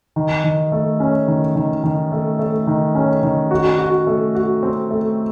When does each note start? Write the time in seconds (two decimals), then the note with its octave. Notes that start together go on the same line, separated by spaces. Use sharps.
0.16 D#3
0.44 D#3
0.72 A3
1.00 C#4
1.28 D#3
1.56 D#3
1.84 D#3
2.12 A3
2.39 A3
2.67 D#3
2.95 C#4
3.23 D#3
3.51 F#4
3.79 F#4
4.07 A3
4.35 F#4
4.63 C4
4.91 A3